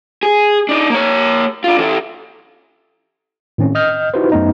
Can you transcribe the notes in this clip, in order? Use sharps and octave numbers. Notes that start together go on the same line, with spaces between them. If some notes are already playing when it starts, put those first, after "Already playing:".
G#4
D4 D#4
A#3 C#5
D4 F4
E3 A4
A2 D#3 C4 C#4
D#5 D#6 F6 G6
D#4 E4 F#4 G4 B4 C5
F#2 A3 B3 D#4